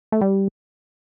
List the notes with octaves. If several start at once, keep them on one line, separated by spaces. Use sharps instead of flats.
A3
G3